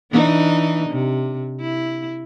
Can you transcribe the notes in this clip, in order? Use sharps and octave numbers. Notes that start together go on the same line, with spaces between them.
E3 D4 D#4
C3
E4